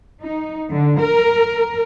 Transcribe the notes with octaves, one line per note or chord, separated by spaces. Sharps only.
D#4
D3
A#4